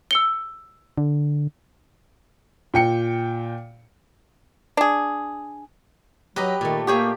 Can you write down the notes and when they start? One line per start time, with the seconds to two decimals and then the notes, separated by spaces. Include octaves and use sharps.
0.11 E6 C#7 G7
0.98 D3
2.74 A#2 G5 C#7
4.77 D4 G#4
6.36 F#3 G4 B4 D#5 A#5
6.61 A#2 D#3 A3
6.87 A#3 G4 G#4 C#5 G5